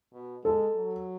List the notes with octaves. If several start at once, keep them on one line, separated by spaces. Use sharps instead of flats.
B2
G#3 A4
F#3